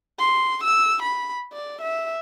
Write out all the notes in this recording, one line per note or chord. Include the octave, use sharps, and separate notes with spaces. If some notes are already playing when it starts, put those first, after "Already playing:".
C6
E6
B5
D5
E5